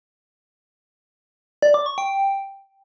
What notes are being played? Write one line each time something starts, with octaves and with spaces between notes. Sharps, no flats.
D5
D6
C#6
G5